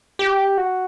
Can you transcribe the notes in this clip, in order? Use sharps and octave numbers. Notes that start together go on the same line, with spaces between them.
G4
F#4